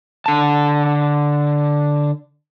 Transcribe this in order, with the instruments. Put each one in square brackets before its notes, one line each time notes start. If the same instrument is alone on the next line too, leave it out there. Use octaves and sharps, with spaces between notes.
[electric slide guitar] D3 A5